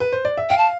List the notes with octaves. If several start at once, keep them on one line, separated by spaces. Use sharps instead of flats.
B4
C5
D5
E5
F5 G5
A5